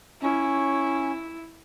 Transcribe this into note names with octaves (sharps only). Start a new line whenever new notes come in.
C#4 E4